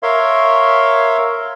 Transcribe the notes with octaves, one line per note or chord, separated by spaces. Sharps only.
A#4 C#5 E5 F5 C6